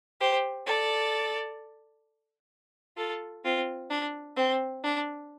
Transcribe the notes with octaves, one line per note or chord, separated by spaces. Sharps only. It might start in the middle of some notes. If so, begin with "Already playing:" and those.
G4 C5
A4 D5
F4 A4
C4 F4
D4
C4
D4